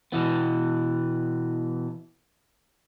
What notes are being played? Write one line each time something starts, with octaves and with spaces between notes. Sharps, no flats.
B2 E3 B3